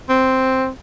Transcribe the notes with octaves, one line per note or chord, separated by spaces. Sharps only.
C4